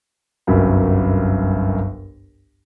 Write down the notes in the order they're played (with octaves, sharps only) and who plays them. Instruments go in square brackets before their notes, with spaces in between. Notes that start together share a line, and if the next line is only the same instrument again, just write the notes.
[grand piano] G1 C2 F#2 B5